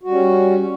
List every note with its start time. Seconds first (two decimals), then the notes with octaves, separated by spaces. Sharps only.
0.03 F#4
0.07 G3
0.12 C#4